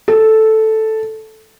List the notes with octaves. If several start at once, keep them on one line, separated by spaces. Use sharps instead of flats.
A4